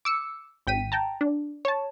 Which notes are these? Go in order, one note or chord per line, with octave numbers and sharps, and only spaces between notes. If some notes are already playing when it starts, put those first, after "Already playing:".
D6 E6 C#7
G#1 G5 B6 D#7
G5 A5 A#5
D4
C#5 A5